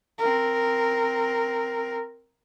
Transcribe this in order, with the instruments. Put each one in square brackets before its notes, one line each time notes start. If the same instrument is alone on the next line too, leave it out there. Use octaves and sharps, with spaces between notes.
[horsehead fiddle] C4 A#4